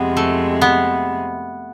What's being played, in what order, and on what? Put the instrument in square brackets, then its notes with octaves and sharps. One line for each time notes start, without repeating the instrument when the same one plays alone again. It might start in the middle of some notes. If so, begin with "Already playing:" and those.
Already playing: [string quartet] F2 C3 G#3 [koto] B3
[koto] A3
B3